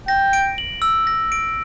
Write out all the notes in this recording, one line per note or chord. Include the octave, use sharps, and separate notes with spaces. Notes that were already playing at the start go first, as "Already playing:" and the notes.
G5 A#6
D7
F#7
E6
A#6
D7